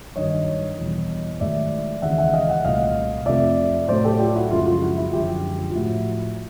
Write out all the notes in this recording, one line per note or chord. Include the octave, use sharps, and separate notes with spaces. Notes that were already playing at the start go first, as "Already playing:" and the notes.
G2 D#3 F#3 C#5 D#5
E2 B2 G3
G#2 D#3 F#3 A3 D5 E5
D#2 C#3 E3 G#3 E5 F#5
E5 F#5
D#5 F5
E5 F#5
C2 A#2 F#3 A3 D#5 F5
F2 C3 F3 A3 D5 E5
A2 F#3 A3 C5 D5
G4 A4
F4 G4
E4 F#4
F#2 C#3 F3 G#3 F4
F4
E4 F#4
E4 F#4
F#2 D3 F3 G#3 F4 G4
F4
A2 F3 A3 E4 F#4